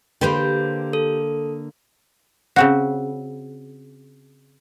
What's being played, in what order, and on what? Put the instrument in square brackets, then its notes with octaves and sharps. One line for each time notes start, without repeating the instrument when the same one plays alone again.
[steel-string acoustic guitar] D3 A#3 [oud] G4 B4 C5
[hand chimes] A4
[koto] C#3 C4 F#4